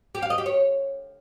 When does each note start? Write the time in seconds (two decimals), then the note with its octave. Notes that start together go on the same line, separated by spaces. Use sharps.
0.15 G4
0.22 F5
0.30 D#5
0.38 G4
0.46 C#5